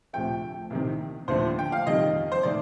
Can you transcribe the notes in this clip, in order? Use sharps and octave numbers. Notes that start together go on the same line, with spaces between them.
D2 C3 F3 A3 G5
C2 C3 D#3
D#2 D3 F3 A3 C5
G5
F5
F2 D#3 G3 D#5
C5
D#3 A3 D5